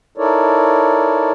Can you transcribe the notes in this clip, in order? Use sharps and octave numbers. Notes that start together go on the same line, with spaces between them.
D#4 E4 A4 A#4 C#5 D5